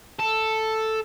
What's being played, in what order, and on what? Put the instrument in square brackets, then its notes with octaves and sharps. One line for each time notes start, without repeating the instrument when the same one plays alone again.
[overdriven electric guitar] A4